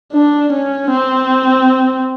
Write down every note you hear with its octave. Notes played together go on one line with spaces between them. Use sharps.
D4
C#4
C4